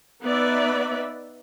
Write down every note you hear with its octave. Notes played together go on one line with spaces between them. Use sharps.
B3 D#4 B4 D5 E5